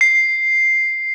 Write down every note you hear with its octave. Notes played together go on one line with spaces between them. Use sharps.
C7